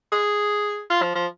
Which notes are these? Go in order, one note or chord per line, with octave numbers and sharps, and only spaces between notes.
G#4
F4
F3
F3